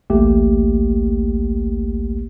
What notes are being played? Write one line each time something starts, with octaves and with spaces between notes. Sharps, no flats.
A1 D2 A3 A#3 G4